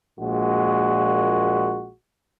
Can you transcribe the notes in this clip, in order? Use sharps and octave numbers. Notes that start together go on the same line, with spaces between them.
A#1 A#2 G#3 F#4